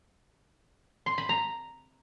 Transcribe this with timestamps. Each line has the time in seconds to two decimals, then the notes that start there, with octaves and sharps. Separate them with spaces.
1.06 C6
1.18 B5
1.29 A#5